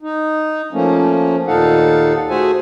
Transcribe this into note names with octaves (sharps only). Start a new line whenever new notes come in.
D#4
F3 A3 A#3 C#4
D#2 A#2 D#4 A4 F5 F#5
A3 F#4 G#4 C5 E5 G#5